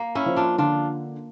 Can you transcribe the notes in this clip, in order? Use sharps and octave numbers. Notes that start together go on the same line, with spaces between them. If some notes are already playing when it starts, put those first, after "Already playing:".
Already playing: A#3
C#4 E4
F3
D4 F4
D3 D4 F4